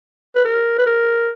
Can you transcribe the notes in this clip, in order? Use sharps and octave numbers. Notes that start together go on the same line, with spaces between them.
B4
A#4
B4
A#4